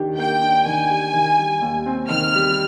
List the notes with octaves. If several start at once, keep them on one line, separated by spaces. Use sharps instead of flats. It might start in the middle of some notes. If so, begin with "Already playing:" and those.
Already playing: D#3 D4 G4
A#3 G5
D4
D#3 G#5
G4
D#3
G3
D#2
C4
D#3 F6
G3